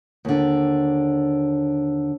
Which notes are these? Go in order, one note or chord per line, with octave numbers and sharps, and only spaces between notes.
D#2 D3